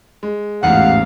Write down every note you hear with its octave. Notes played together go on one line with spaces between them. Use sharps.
G#3
A1 E2 G#2 F5 F#5